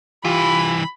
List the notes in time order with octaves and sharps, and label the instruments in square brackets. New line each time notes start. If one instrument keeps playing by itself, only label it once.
[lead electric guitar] C2 E3 [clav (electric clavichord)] F4 G4 [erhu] B5